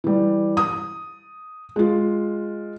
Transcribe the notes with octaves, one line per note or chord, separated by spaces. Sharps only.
E3 G3
D#6
G#3 F4